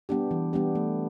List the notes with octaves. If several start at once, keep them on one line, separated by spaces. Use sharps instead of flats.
G3 B3 D4 G4
E3
G3 B3 D4 G4
A3